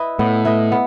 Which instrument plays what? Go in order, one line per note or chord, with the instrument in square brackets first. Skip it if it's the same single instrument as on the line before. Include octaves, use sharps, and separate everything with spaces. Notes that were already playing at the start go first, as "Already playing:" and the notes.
Already playing: [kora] E4 B4 D#5
[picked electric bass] A2 [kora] B3
[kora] E4 B4 D#5
B3